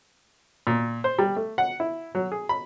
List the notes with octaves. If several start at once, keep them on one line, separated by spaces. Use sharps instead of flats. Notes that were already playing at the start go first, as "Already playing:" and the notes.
A#2
C5
G3
A3
F#5
E4
F#3
G#4
B5